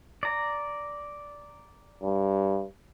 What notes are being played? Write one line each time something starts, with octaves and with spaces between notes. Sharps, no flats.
D5 A#5
G2